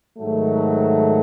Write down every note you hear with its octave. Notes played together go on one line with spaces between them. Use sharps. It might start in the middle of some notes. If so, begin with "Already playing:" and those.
G#2 D#3 F#3 A3